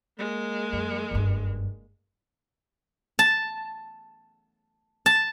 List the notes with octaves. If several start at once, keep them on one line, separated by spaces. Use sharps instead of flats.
G#3 A#3
F#2
F#1 G2
A5
A5